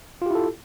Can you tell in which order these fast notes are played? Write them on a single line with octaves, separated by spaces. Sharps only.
F4 G4 E4 A4